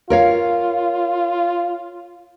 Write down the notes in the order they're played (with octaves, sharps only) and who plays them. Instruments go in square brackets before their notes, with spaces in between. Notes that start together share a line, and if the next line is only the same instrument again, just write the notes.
[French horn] F4 [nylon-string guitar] A#4 C#5 F5